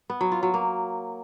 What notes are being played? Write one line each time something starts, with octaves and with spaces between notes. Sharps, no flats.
B3
F#3
F4
F#3
A#3